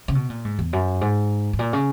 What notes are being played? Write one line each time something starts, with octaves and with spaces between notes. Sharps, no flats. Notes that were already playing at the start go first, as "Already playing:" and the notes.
C#3
B2
A#2
G#2
E2
F#2
G#2
G#2
A#2
C#3